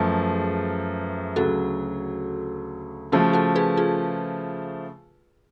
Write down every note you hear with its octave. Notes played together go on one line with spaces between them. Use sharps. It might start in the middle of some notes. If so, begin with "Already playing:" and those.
Already playing: F#2 F3 A3 G#4 B4
D2 C#3 F#3 F#4 A4
C#3 F3 A3 F#4 A4
F#4 A4
G#4 B4
F4 G#4